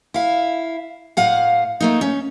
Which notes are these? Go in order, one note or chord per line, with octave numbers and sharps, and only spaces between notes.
E4 F5
A2 F5 F#5
A3 A#3 D#4
C#4